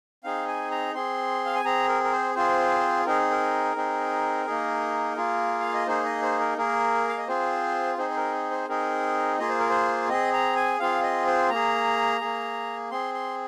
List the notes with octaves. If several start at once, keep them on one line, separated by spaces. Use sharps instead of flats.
C4 D#4 G#4 F5
G#5
A#5
C4 G#4 C6
F5
G#5
C4 G#4 A#5
A#4
A#4
C5
C4 F4 G#4 C5
C4 D#4 G#4 A#4
A#4
C4 D#4 G#4
A#3 D#4 G#4
A#3 F4 G#4
F5
D#5
A#3 D#4 G#4 C5
D#5
C5
A#4
A#3 G#4 A#4
F5
D#5
C4 F4 G#4 C5
C4 D#4 G#4 C5
C5
A#4
C5
C4 D#4 G#4 A#4
A#3 F4 G#4 D#5
C5
A#4
C5
C4 G#4 D#5
A#5
G#5
C4 F4 G#4 F5
D#5
C5
A#3 G#4 A#5
A#3 G#4
C4 G#4 C6
C6